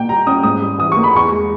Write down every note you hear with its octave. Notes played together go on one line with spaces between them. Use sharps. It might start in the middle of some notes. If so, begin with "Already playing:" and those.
Already playing: A#2 A#3 G5
G3 A#5
C#4 D#6
G#2 D#6
G3
E3 D#6
A#3 C#6
B5
E2 C#6
G#3